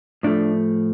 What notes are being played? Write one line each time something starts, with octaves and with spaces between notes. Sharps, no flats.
A2 F3 A3 D4